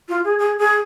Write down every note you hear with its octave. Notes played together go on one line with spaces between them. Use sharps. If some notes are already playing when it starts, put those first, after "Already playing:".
F4
G#4
G#4
G#4